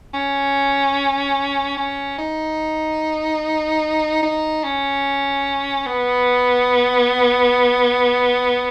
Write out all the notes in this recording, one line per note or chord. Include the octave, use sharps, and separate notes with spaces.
C#4
C#4
D#4
D#4
C#4
B3